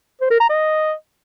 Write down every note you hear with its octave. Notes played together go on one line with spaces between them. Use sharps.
C5
A#4
A#5
D#5